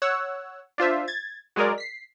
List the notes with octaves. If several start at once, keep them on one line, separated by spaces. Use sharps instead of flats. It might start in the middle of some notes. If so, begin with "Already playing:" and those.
C#5 F#5 E6
D4 F4 C5 E5
G#6 A6
F#3 G#3 G#4 A#4 D5
B6 C7